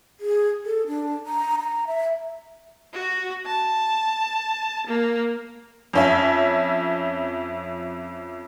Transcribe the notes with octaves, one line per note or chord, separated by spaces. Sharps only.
G#4
A4
D4
A#5
A#5
E5
F#4
A5
A#3
F2 C#4 E5